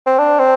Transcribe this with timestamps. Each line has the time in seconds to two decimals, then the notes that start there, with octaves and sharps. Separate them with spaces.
0.06 C4
0.18 D4
0.39 C4